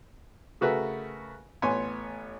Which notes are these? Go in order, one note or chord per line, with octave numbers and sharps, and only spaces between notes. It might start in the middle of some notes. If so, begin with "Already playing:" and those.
C#3 A3 F#4 A#4 B4 E5
A1 B3 C#5 G#5 C6